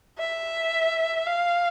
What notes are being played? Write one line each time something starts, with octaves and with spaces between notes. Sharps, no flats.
E5
F5